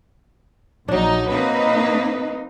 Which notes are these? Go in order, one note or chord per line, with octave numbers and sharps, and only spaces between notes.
A#1 F#3 D4 D#4
A#3 C4 D#4 B4 D#5